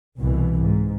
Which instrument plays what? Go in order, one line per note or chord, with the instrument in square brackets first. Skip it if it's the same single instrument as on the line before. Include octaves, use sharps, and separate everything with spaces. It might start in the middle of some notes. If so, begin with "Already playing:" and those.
[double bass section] C2 B2 E3
G#2